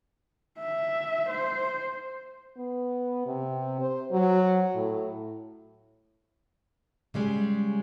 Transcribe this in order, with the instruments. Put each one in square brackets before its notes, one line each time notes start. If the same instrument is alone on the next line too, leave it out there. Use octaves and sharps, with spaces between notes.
[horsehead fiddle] E5
C5
[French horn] B3
C3
C5
F#3
A2
[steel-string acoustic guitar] C#3 G3 G#3